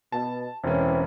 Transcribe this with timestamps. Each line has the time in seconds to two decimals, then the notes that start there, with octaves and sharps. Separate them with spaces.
0.12 B2 A5
0.64 E1 E3 C4 C#4